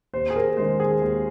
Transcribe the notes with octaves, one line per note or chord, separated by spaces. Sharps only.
D#2 C5
G#4
A#4
D#3 G#3 C5
G#4
D#2